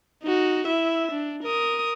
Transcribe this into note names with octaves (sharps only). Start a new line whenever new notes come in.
D#4 F#4
E4 E5
D4
A#4 D#6